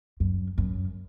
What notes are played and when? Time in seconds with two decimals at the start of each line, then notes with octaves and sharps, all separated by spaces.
0.20 F#2
0.58 F#2